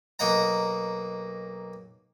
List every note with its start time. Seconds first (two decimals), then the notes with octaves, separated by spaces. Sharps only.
0.19 B1 A#3 D#5 F#5 A#5